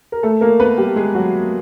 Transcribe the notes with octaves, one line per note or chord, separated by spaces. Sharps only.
A#4
A3 A4
A#3 A#4
B3 B4
G3 G4
G#3 G#4
F#3 F#4